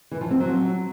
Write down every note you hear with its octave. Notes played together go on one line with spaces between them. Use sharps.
E3
F3
C4
F#3